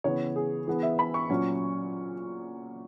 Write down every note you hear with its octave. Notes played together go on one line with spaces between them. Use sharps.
C#3 E3 B3 C#5
G#4
E3 B3 G#4
E5
B5
C#6
A#2 F#3 C#4